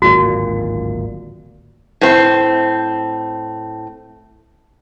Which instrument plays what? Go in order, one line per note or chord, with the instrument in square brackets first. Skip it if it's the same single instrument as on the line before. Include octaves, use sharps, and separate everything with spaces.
[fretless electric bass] D1 G#1 A#2 [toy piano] F#4
[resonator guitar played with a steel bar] A2 C4